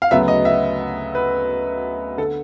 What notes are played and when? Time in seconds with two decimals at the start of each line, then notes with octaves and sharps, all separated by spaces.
0.02 F5
0.11 D2 C#3 F#3 B3 E5
0.28 D#5
0.45 E5
1.15 B4
2.18 D3 A4